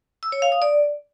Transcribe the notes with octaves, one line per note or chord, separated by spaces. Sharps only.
E6
C#5
F5
D#6
D5